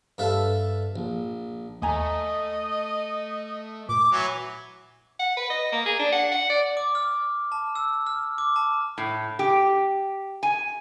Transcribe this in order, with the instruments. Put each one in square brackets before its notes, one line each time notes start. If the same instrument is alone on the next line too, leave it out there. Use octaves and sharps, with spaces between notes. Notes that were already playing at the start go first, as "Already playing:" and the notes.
[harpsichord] G2 A4 B4 E5 F5 A5
A#1
[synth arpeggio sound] D#2 G#5 A#5 [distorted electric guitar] A3 [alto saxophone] D#5
[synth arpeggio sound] A#2 [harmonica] D6
[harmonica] E3 F#3
[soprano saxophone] F#5
B4
D#5
A#3
G#4
D4
F#5
F#5
D5
[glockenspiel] D6
F6
A5
E6
F6
D6
A5
[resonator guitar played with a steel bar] A2
G4
G#5